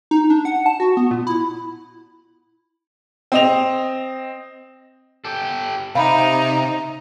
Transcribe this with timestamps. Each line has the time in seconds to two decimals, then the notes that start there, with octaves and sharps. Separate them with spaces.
0.11 D#4
0.30 D4
0.45 F#5
0.66 A5
0.80 F#4
0.97 B3
1.11 A#2
1.27 E4
3.32 C4 D#5 F7
5.25 G4 A4
5.95 C3 D#4 F5 B5